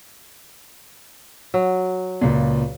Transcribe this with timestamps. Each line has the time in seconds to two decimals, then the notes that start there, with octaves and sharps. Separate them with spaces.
1.54 F#3
2.21 C#2 A#2